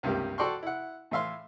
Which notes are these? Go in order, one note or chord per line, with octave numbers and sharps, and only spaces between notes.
C#2 G2 C3 A#3 G4
F#4 A4 D5 G5 C6 C#6
E4 F#5
A2 E3 E5 F5 C6